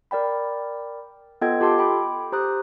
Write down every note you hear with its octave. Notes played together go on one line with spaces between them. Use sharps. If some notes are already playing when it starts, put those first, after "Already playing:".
A#4 D5 G5 B5
B3 F4 A4 D#5 G5 G#6
F4 G4 A4 A5 C6 D6
G5 B5 D6
G4 C5 A#5 D#6 F#6